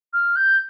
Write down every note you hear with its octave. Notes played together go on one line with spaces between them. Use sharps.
F6
G6